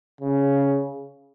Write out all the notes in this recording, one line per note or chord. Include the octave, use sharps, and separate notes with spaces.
C#3